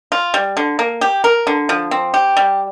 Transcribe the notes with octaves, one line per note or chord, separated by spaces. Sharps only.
F4
G3
D3
A#3
G4
A#4
D3
F3
C4
G4
G3